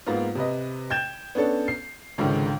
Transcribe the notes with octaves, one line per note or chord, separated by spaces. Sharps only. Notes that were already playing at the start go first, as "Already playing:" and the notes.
G#2 A#3 B3 F4
C3 B4 D#5
G5 G6 G#6 E7
B3 C#4 D4 A4
C7
C#2 G#2 D3 D#3